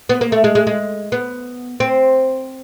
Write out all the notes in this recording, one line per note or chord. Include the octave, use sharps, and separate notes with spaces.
B3
A#3
A3
G#3
G#3
G#3
B3
C4